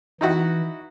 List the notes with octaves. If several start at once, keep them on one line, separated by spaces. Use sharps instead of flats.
E3 D#4 E4 F#4